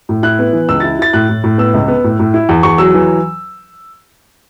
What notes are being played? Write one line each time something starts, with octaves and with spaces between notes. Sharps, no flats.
A2
E4 F#6
B3
E3
C#2 E6
E4 A6
E4 A6
A2 F#6
A2
A2
B3 E6
C#2
B3
A2
A2
E4
E2
E2 C#6
F#3 E6
E3